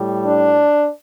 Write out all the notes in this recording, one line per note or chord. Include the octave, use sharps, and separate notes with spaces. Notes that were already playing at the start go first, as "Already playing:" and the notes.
Already playing: A2 G3
D4